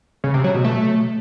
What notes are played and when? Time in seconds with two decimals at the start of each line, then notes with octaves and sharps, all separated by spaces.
0.24 C#3
0.34 C3
0.44 F#3
0.54 B2
0.64 A3